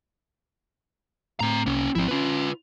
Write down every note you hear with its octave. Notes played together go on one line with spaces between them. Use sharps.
A2 C4 A#5
C2 A#3 C#4
G#1 F3 C4 E4
C4 C#4 F4 B4